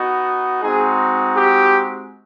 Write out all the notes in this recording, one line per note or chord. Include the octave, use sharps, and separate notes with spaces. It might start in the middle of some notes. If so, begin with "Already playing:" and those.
Already playing: B3 D#4 F#4
G#3 C4 D#4 F#4 G#4
G4